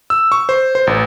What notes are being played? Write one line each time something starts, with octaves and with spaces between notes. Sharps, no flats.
E6
C#6
C5
C5
A1